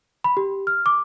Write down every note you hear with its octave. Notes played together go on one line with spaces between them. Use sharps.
B5
G4
F6
D6